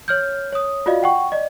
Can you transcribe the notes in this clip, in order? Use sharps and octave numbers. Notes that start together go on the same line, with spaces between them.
C#5 F6 G6
C#5 D#6
F4 F#4 D5 D#5 F5
F#5 G5 C#6
D5 D#5